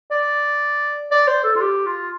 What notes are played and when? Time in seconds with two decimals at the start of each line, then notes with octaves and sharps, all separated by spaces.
0.11 D5
1.11 D5
1.27 C5
1.44 A4
1.56 F4
1.60 G4
1.86 F4